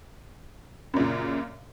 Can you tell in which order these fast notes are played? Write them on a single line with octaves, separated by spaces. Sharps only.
F#2 A#2 C#3